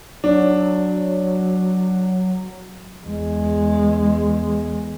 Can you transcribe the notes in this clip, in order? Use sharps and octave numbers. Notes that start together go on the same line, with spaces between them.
F#3 D4
E2 G#3